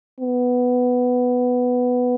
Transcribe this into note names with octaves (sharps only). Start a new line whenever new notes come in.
B3